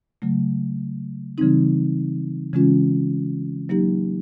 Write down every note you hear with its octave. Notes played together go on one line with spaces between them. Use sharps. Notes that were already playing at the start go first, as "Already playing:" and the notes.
C#3 F#3 A3
C#3 E3 G3 C4 D#4
C#3 E3 G#3 C#4 F4
F#3 A#3 D#4 G4